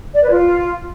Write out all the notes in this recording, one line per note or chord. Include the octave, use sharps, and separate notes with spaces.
D5
B4
F4